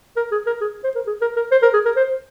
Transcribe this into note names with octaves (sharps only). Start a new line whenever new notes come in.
A#4
G#4
A#4
G#4
C5
A#4
G#4
A#4
A#4
C5
A#4
G#4
A#4
C5